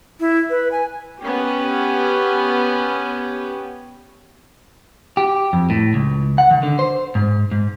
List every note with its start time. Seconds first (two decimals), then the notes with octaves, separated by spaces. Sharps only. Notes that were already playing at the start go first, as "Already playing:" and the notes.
0.20 E4
0.50 B4
0.72 G#5
1.20 B3 C#4 G4
5.17 G4
5.53 F2
5.70 A2
5.94 C#2
6.38 F#5
6.51 D#3
6.63 D3
6.79 C5
7.15 G#2
7.52 G#2